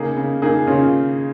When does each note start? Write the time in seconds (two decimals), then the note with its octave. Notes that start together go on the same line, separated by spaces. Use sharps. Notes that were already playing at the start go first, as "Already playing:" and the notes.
Already playing: C#3 A#3 D#4 G#4
0.16 C#3
0.42 A#3 D#4 G#4
0.67 C#3 C#4 F4